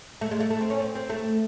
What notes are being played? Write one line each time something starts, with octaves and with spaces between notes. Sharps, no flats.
A3
G#3
A3
A3
C4
C#4
C4
C4
A3